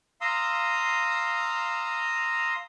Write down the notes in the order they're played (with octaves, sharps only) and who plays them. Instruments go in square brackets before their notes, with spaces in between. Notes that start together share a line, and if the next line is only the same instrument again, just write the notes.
[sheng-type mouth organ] F5 A#5 C6 D#6 E6